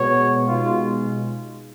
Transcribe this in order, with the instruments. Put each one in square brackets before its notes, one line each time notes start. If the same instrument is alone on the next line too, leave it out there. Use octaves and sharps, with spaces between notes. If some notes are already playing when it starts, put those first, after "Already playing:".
Already playing: [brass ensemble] B2 G#3 B3 C#5
B2 G#3 D#4 F4